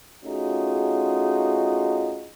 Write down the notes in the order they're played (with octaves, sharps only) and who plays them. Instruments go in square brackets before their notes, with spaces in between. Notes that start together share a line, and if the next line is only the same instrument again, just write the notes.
[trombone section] A3 C#4 D#4 F4 F#4 G#4